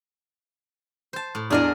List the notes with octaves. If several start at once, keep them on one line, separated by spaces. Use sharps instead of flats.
C5 A5
A2
E2 D4 G#4 A#4 D#5